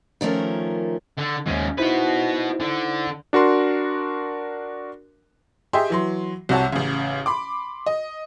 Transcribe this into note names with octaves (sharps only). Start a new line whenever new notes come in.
D#3 F3 A3 C#4 A#4
D3
D#2 G#2 D#3 C#4
D#4 E4 F#4 B4 C5
D3
D4 F#4 A#4 C6
G4 G#4 D#5 E5 G5 C6
E3 F#3 C6
C2 C3 F#4 C#5 A5
A1 C#3
B5 C6 D6
D#5